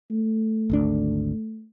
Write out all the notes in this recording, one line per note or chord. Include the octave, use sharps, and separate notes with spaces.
A3
G#1 D2 D4